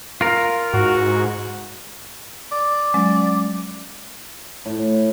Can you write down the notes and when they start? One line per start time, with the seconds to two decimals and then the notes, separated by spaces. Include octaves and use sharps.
0.21 F4 A#4
0.74 G#2 F#4
2.52 D5
2.94 F#3 G#3 C#4
4.65 A2